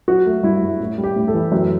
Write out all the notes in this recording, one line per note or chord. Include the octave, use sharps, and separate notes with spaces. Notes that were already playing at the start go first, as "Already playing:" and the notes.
F#3 F#4
A3
G2 E4
G2
A2
G3
G4
A2
A4
E3
F#2